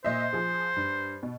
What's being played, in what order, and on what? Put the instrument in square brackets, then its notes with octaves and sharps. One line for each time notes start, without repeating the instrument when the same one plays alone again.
[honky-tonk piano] A#2 D#5 E5 [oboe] C5
[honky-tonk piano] F3 G#4
G2
B2